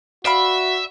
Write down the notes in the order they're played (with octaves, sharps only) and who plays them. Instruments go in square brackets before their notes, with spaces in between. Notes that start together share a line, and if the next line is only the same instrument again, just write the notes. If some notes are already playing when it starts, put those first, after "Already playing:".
[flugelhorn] F#4 [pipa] D5 F5 B5 [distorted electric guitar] E5